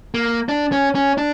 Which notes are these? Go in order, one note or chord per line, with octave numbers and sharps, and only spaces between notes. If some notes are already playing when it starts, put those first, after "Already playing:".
A#3
D4
C#4
C#4
D4